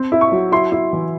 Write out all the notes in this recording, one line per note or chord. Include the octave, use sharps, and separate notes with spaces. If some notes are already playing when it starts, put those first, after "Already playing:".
Already playing: C4
E4
C#6
F#3
E4 C6
E4
E3